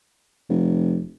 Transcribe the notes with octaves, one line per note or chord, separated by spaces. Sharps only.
F1